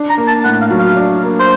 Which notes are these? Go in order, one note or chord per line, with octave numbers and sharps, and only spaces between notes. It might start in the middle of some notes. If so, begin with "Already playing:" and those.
Already playing: D4
A#5
A#3
A5
A2 F#5
F5
F#3
F5
D4
A#3
C5